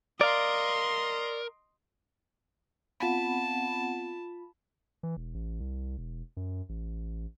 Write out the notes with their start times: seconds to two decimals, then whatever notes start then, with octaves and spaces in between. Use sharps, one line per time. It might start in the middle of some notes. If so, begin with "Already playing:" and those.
0.21 A#4 D5 D#5 F5 C6
3.00 B3 C4 F4 F#5 A5 B5
5.03 E3
5.17 E1
5.34 A1
5.60 C2
5.98 E1
6.37 F#2
6.69 A1